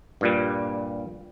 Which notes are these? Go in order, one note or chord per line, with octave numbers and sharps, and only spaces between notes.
G2 A#2 G3